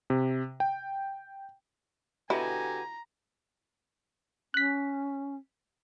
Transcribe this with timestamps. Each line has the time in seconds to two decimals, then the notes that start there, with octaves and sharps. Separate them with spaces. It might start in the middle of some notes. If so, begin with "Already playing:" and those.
0.10 C3
0.60 G5
2.30 D3 E4 F#4 G4 B4 G#5 A#5
4.54 C#4 F#6 B6